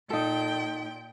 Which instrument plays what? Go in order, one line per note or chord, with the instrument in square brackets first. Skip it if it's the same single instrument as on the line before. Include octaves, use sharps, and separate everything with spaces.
[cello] A#2 G5 [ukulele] D#4 A4